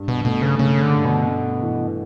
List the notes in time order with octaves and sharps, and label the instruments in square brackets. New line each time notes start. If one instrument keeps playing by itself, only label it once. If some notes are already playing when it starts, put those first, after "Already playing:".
Already playing: [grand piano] G2
[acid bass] B2
[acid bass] B2 [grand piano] A3
[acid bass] C#3
[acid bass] C#3 [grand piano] A3
[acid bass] D3
[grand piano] G2
[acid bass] B2
[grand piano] A3
E3